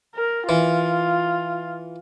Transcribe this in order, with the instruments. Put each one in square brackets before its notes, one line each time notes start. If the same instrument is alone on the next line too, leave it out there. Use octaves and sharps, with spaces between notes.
[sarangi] A#4
[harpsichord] E3 [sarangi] F4